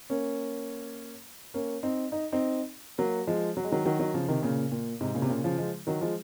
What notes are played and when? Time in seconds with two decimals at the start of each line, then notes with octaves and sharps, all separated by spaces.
0.10 A#3 C#4
1.54 A#3 C#4
1.83 C4 D#4
2.12 D#4
2.32 C4 D#4
2.98 F#3 A#3
3.27 F3 G#3
3.57 F#3
3.64 G#3
3.72 D#3 F#3
3.85 D#3 F#3
3.99 D#3 F#3
4.14 C#3 F3
4.28 C3 D#3
4.43 A#2 C#3
4.72 A#2
5.01 G#2 C3
5.15 A#2 C#3
5.22 C3
5.29 A#2 C#3
5.44 C#3 F3
5.58 F3 G#3
5.87 D#3 F#3
6.01 F3 G#3